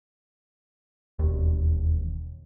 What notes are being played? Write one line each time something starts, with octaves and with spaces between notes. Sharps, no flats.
E1 D#2